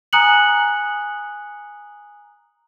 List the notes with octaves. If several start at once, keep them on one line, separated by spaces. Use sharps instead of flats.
G#5 A#5 D#6 F#6 C#7 F#7